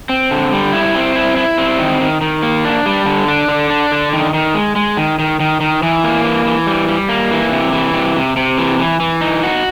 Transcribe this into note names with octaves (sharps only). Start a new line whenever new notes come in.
C4
D3
G3
E4
C4
E4
E4
C4
D#3
D#3
D#3
A#3
D4
G3
D3
D4
D3
D4
D3
D#3
D#3
G#3
G#3
D#3
D#3
D#3
D#3
E3
A#3
E3
E3
G3
G3
A#3
E3
C3
E3
C3
C3
C3
E3
E3
E3
D#4
F#4